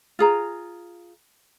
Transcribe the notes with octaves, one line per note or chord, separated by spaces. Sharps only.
F4 G#4 A#5